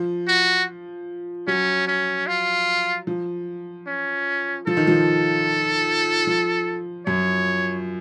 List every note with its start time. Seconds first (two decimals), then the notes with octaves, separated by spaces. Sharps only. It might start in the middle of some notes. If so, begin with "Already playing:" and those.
Already playing: F3
0.28 F#4
1.47 F#3 C#4
1.87 C#4
2.27 F4
3.07 F3
3.87 C#4
4.67 F3 A4
4.77 D#3
4.87 F3
6.27 F3
7.06 F#2 C#5